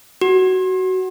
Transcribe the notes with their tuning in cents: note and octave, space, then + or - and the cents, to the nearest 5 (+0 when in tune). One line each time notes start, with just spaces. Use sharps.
F#4 +15